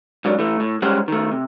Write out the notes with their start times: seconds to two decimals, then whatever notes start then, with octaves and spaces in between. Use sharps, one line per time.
0.25 G#2 F#3 D4
0.39 E3 A3
0.60 A2
0.82 G3 G#3 C#4 G4 C5 F#5
1.08 D#3 A3
1.32 C3